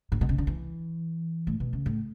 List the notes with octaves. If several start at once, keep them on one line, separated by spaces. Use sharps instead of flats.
A2
B2
C#3
D3
E3
A2
B2
C#3
A2